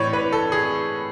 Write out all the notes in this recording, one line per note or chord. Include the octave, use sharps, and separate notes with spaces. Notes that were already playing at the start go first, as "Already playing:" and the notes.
Already playing: A2 E3 C#5 D5
B4
A4
G#4